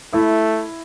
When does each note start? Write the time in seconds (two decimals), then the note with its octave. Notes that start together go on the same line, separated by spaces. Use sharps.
0.13 A3 E4